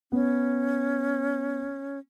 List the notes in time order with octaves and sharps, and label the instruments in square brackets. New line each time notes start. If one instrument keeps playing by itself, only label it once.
[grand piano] B3 [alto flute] C#4